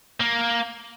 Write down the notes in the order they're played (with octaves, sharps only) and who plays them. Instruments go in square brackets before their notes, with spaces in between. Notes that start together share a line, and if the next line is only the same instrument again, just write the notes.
[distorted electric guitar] A#3